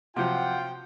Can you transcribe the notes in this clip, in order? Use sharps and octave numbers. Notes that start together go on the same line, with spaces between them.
C3 F3 F#3 F4 F#5 G5